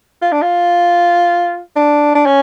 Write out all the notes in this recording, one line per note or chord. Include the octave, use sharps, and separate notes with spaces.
F4
D4
F4
D4
D4
C#4